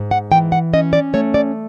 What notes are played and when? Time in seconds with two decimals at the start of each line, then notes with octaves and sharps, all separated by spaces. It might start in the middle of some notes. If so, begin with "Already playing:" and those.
Already playing: G#2
0.11 F#5
0.32 E3 G5
0.52 F#5
0.73 C#4 D#5
0.93 D5
1.14 A3 C#5
1.34 D5